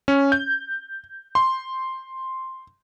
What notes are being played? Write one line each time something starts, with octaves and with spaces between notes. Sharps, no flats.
C#4
G6
C6